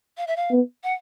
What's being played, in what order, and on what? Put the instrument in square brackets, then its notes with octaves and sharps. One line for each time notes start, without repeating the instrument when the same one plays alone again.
[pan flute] F5
E5
F5
[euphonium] B3
[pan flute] F#5